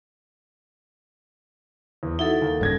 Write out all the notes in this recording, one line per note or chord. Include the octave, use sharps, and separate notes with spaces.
E2
D#4 E4 F#4 A4
D#2
D#1 G2 C#3 G#6 A#6